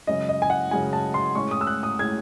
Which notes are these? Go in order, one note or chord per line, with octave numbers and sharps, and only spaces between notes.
F#2 C#3 G#3 C#4 D#5
D#5
G#5
F#5
F#2 C#3 G#3 C#4 G#5
A5
C6
A2 G#3 C#4 C#6
D#6
E6
F#6
D#6
A2 G#3 C#4 G#6